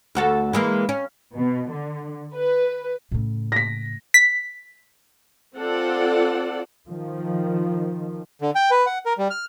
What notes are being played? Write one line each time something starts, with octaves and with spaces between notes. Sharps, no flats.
D2 F#4 A4
E3 G#3 A#3
C#4
B2
D3
B4
A2 C#3
A#6 B6
B6
C4 F4 A4 D5 F#5
D#3 F3
D3
G5
B4
F#5
A#4
G3
F6